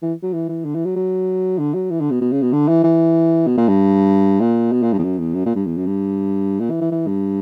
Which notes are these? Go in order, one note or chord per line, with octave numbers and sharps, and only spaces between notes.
E3
F#3
E3
E3
D3
E3
F#3
F#3
D3
F#3
E3
D3
B2
B2
C#3
B2
D3
E3
E3
B2
A#2
G2
A#2
B2
A#2
G2
E2
F#2
E2
F#2
A#2
G2
E2
F#2
G2
A#2
E3
E3
E3
G2